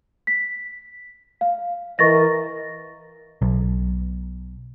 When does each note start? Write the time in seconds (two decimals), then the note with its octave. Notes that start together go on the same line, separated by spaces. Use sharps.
0.27 B6
1.41 F5
1.99 E3 A#4 D#5 C#6 A6 A#6
3.42 B1